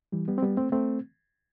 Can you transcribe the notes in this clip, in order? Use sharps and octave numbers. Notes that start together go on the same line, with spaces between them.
E3 G3
G3 B3
C4
G3 B3
A3 C4
A3 C4